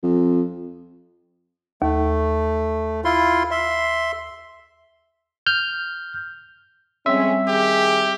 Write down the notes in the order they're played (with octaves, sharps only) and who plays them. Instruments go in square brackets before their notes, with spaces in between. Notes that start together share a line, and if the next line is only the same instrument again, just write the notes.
[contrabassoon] F2
[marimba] D#2 [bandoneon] A3
[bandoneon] E4 F4 C6
E5 C6
[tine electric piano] F6 G6
[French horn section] F2 G#3 C#4 [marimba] G3 C4 [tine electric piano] E5
[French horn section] D#3 G#4 [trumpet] G4